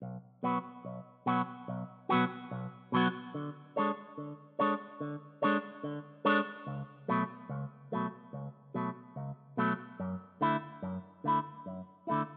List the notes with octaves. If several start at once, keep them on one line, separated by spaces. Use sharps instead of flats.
B1
B2 F#3 B3 F#4
B1
B2 F#3 B3 F#4
B1
B2 F#3 B3 F#4
B1
B2 F#3 B3 F#4
D3
G#3 D4 A4 C#5
D3
G#3 D4 A4 C#5
D3
G#3 D4 A4 C#5
D3
G#3 D4 A4 C#5
C#2
B2 F#3 A3
C#2
B2 F#3 A3
C#2
B2 F#3 A3
C#2
B2 F#3 A3
F#2
D3 A3 E4
F#2
D3 A3 E4
F#2
D3 A3 E4